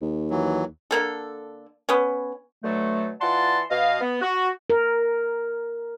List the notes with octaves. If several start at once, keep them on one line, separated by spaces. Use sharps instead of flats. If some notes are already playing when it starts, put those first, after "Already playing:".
D#2
E3 F#3
D3 A#3 A4
B3 C#4
B2 D3 F#3 A3
E3 F4 D5 F#5 A5 C6
B2 D#5 F5
B3
F#4
A#4